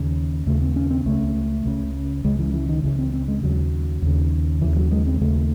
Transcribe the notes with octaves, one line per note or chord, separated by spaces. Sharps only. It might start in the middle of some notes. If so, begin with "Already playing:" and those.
Already playing: D#2 C#3
D#2 C#3 A3
C4
C#4
C4
C#2 C#3 A3
C#2 C#3
C#2 C#3 G#3
E3
E3
D#3
C#2 C#3 E3
C4
C4
G#3
D#2 C#3 F#3
D#2 C#3
D#2 C#3 E3
F#3
G#3
C4
D#2 C#3 A3